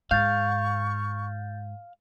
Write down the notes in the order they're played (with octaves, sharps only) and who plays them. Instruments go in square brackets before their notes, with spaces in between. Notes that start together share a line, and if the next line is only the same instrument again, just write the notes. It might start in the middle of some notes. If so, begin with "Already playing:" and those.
[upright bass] G#2 [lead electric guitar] F5 [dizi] C#6 [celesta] G6 A6